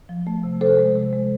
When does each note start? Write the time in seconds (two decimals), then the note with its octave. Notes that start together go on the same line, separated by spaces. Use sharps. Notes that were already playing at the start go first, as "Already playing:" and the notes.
0.09 F3
0.27 A3
0.44 C3
0.61 C3 A4 C5
0.79 G#3
0.96 C3
1.13 G#3